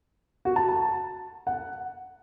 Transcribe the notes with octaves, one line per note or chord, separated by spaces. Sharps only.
F#4
A5
A5
F#5